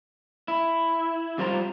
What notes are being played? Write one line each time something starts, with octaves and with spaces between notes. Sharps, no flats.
E4
F2 G3 F4 C5 A#5